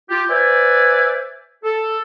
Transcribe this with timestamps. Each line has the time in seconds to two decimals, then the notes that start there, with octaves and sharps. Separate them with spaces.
0.10 F4 G4
0.29 B4 C5 D5 E5 G#5
1.63 A4